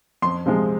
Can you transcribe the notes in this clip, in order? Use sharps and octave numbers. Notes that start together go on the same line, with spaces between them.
F2 C6
C3 F3 G#3